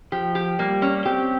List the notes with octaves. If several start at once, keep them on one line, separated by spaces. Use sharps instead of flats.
F3 G4
G4
G3 A#3
C#4
C4 G4